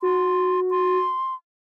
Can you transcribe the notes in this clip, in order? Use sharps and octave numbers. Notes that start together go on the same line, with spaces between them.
F#4 C6
C6